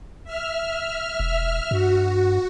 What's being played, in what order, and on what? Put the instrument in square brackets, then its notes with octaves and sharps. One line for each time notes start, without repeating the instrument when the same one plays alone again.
[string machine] E5 F6
[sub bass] E1
[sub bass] G2 [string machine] F#4